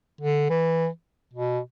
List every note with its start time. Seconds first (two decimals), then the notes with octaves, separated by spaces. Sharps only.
0.21 D3
0.49 E3
1.34 B2